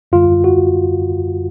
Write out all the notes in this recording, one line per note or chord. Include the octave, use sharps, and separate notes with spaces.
F#2 D3 G3 F4
F#4